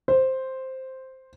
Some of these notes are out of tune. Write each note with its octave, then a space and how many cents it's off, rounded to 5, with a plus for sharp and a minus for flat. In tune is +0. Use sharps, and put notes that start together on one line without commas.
C5 +0